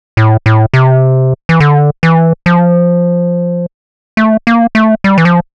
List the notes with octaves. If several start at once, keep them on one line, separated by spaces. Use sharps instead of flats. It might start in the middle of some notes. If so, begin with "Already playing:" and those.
A2
A2
C3
E3
D3
E3
F3
A3
A#3
A3
G3
E3
F3